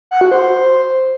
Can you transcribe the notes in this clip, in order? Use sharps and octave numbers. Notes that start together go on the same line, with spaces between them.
F#5
F#4
C5